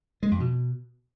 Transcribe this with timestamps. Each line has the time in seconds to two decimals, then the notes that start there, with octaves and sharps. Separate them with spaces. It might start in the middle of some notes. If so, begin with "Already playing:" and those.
0.23 G#3
0.31 F2
0.40 B2